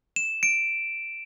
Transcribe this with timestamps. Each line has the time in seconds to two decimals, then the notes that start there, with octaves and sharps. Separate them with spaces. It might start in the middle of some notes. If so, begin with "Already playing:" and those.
0.16 E7
0.43 D7